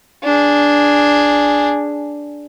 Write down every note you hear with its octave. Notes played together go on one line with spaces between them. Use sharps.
D4 G#4